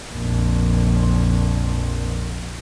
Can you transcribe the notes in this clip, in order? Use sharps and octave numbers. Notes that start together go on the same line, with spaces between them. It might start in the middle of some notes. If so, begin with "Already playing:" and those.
A#1 F2